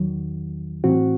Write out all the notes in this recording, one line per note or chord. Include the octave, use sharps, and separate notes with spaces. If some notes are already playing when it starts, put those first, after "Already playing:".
Already playing: E2 D#3 F#3
A2 E3 C4 F#4